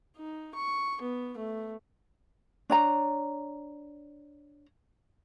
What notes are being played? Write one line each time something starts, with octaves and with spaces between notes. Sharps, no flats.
D#4
C#6
B3
A3
D4 C#5 A#5